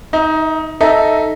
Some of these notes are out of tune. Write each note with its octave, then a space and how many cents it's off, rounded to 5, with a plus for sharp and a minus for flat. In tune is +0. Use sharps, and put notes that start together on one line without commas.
D#4 +15 E5 -30
D#4 +0 A4 +0 E5 -10